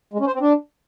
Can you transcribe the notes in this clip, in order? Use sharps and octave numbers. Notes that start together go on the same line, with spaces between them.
G#3
C#4
C5
C4
D4